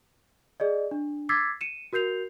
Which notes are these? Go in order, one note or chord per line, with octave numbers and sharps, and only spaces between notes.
G#4 D5 D#5
D4
D6 E6 G#6 A6 B6 C7
C#7 D#7 E7
F#4 A#4 G6 C7 F7